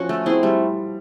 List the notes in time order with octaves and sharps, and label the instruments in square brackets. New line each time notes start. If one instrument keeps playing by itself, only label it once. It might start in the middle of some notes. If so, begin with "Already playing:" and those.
Already playing: [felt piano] F3 [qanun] C#4 F#4
[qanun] A3
C4 E4 G#4
[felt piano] G3 [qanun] A3